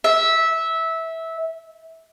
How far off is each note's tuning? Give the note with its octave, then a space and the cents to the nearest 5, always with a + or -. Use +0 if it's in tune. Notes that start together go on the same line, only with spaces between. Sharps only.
E5 -15